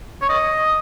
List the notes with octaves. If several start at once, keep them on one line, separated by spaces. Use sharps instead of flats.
C#5
D#5